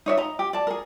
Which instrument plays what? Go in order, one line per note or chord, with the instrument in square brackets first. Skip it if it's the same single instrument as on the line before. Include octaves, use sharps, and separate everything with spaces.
[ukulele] D#4 C#5 D5 E5
D#5 A#5
G4
D5 A5
G#4 A#4